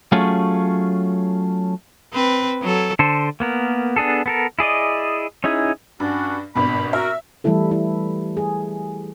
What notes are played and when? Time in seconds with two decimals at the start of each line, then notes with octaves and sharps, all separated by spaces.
0.12 F#3 A3 C#4 F4 G#4
2.13 C4 B4
2.62 F#3 A4
2.99 D3 A4 C5
3.40 A#3 B3 A#4
3.96 B3 D4 G#4 A4
4.26 B3 A4 A#4
4.59 E4 G#4 D5 D#5
5.44 C#4 D#4 E4 G#4
6.00 G2 C#4 D4 F#4
6.55 G#1 G2 B2 B5
6.93 F#4 A#4 E5
7.44 E3 G3 A3 E4 A4
7.71 E4
8.37 G#4